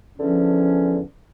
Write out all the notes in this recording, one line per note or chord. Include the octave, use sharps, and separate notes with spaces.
E2 D3 F3 C#4